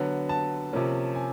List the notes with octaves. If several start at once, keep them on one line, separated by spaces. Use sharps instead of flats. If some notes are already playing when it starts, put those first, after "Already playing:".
Already playing: D3 F#3 B3
A5
C3 F3 A#3 C#4
G#5